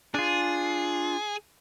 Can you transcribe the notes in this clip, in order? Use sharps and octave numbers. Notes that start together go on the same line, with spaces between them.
D4 F4 G#4